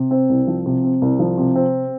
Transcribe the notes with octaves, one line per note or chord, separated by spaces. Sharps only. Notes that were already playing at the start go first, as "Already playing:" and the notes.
Already playing: C3
C4
C2
F3
C3
C4
C2
F3
C3
C4